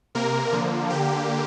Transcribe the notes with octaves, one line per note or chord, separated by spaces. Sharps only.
C3 A#3 A#4
D3 F3 A#3
D3 A#3 G4